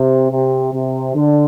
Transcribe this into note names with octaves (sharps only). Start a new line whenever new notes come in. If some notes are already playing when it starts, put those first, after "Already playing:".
Already playing: C3
C3
C3
D3